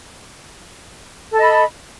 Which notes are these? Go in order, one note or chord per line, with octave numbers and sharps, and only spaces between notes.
A4 D#5 B5